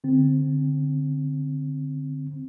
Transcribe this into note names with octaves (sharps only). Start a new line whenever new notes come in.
D3 C4